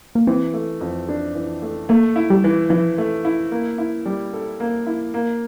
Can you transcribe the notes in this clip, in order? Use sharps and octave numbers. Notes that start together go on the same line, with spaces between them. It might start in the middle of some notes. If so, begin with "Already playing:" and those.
A#3
E3 C4
A3
F2
D4
E3
A3
A3 A#3
E4
G3
E3
E3 F3
A3
E4
A#3
E4
G3
A4
A#3
E4
A#3